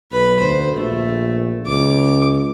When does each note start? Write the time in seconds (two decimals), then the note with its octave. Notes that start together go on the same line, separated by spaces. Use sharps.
0.12 B1 B4 B5
0.40 D2 C5
0.76 A#1 A3
1.66 C#2 D6